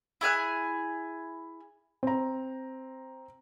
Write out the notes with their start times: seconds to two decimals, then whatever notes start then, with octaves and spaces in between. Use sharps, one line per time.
0.21 E4 G#4 G#5 F#6
2.03 C4 A#5